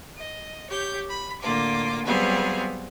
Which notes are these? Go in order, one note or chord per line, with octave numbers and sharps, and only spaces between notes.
D#5
G4 C#5 G6
B5
A2 D3 A#3 F4 D6
F#3 G3 B3 C4 G#4 F5